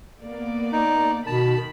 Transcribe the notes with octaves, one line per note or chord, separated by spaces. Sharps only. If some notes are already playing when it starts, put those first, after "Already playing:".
A#3 B3 D5
D#4
B2 D#3 A5 B5